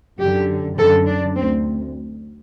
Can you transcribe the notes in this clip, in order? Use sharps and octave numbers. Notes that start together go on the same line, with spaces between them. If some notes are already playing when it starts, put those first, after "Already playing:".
F#2 D3 G4
F#2 D3 A4
D4
D2 C4